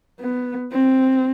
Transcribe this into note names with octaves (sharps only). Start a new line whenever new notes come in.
B3
C4